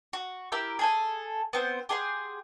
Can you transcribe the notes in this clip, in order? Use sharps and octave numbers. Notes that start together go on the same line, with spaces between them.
F#4
E4 G4 A#4 E6
G#4 A4 G#5
B3 C4 C5
G4 G#4 F#5 C6